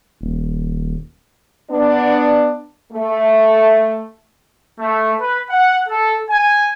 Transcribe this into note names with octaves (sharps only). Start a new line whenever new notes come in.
D#1
B3 D4
A3
A3
B4
F#5
A4
G#5